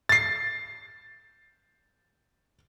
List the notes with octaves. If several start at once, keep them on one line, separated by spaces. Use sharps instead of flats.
A6 C7